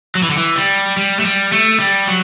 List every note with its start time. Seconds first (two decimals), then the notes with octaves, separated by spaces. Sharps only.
0.15 F#3
0.23 E3
0.30 D3
0.37 E3
0.56 G3
0.97 G3
1.19 A3
1.25 G3
1.52 A3
1.80 G3
2.07 F#3